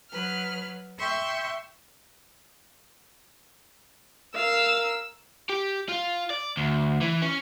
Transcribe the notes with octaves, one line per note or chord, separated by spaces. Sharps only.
F#3 B4 F6
E5 G5 C6 C#6
A#4 F5 E6
G4
F4
D5
D2
E3
C#4